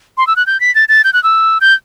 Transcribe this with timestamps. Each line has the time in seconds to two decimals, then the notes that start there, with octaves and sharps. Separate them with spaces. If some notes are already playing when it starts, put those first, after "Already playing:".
0.18 C6
0.27 E6
0.36 F#6
0.47 G6
0.60 B6
0.75 A6
0.89 A6
1.04 G6
1.13 F#6
1.23 E6
1.61 G6